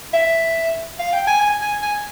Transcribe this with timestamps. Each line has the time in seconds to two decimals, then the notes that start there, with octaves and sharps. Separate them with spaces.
0.14 E5
0.99 F5
1.13 G5
1.27 G#5
1.41 G#5
1.62 G#5
1.82 G#5